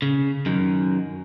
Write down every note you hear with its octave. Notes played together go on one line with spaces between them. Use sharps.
C#3
F#2 D#3